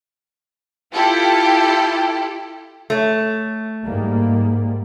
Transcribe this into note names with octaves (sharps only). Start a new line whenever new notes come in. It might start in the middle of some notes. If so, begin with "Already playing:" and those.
E4 F4 G4 A4
A3 C#5
G#2 G3 A#3